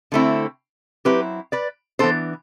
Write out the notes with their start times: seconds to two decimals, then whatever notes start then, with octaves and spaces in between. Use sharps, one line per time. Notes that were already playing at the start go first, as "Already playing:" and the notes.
0.12 D3 A3 C4 E4
1.05 F#3 C4 E4 G4 B4
1.52 B4 D5
1.99 E3 B3 D4 A4 C5